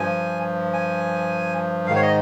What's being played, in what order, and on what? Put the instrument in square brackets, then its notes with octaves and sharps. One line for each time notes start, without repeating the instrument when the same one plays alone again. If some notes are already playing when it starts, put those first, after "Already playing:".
Already playing: [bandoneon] G2 F3 G#5
G#5
G#2 D#3 F5
C#5
D#5